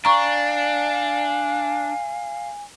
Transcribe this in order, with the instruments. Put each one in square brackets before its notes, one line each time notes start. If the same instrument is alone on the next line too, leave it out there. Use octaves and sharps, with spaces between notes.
[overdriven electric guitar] D4 [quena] F5 [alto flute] G#5 [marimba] A#5 C#6